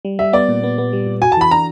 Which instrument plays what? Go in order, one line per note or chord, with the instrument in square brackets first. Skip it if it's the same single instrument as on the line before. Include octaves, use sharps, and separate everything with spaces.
[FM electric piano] G3
[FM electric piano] G3 [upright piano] E5
[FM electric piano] B3 [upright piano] D5
[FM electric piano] A#2
B3
B3
G3
A#2
[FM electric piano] F#4 [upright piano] G#5
[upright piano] A5
[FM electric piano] E3 [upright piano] B5
[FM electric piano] D4 [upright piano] A#5